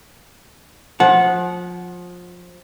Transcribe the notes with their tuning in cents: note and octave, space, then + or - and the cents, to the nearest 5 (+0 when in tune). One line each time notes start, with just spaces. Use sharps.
F3 +25 F#5 -10 A5 -30